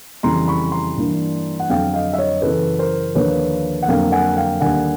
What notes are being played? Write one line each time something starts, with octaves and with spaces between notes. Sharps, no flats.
F2 C#3 E3 G3 C4 A#5 C6
B5 C#6
A#5 C6
G2 E3 G3 A#3 D4
F#5
F2 D3 F#3 F5 G5
D#5 F5
E5
C#5 D#5
F#2 C#3 E3 A4 B4
A#4 C5
D#2 D3 F3 A#3 B4 C#5
F#5
F2 D3 F#3 A#3 F5 G5
F#5 G#5
F5 G5
D#2 D3 G3 A#3 F#5 G#5